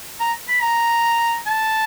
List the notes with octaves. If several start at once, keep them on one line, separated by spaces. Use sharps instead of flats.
A#5
B5
A#5
A5